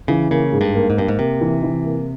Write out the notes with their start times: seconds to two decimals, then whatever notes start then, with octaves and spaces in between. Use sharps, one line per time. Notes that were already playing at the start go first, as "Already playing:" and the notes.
0.08 C#3 E3
0.30 C#3 A#3
0.52 G#2
0.61 G2
0.75 A#3
0.90 G#2
0.97 G2 A#3
1.08 G#2
1.19 C3 A#3
1.41 E3
1.63 E3
1.85 A#3